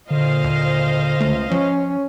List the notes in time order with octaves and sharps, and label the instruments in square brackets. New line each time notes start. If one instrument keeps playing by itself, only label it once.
[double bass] A#2 [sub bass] D3 [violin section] C5 D#5 F5
[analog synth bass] D#2
[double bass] C#2 [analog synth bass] A3
[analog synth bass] F3 [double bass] C#4